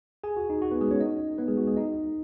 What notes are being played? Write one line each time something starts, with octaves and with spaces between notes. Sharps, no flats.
G#4 G#5
F#4
D#4
F#4
B3 B4
G#3 G#4
C#4 C#5
D#4 D#5
B3 B4
G#3 G#4
F#4
G#3 G#4
D#4 D#5